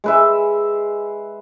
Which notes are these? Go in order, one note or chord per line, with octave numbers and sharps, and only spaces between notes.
G#3 B4 E5